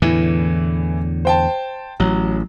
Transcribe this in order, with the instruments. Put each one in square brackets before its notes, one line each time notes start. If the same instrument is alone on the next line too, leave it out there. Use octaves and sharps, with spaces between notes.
[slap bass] E2 A2 D3 [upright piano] E3
[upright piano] C5 G5 A5
[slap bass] A1 [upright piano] F#3